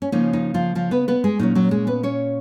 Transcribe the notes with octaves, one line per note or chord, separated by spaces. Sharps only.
C#4
C#3 F3 A#3 C#4 D#4
D#4
F3 F4
F3 F4
B3 B4
B3 B4
G#3 G#4
A#2 F#3 C#4 D#4
F#3 F#4
G#3 G#4
B3 B4
C#4 C#5